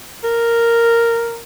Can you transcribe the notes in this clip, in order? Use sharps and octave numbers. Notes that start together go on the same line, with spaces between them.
A#4